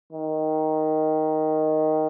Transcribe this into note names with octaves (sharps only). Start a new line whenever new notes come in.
D#3